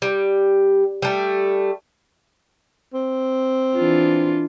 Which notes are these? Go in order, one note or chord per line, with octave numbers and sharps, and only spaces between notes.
G3
G3 A3
C4
E3 D4 F4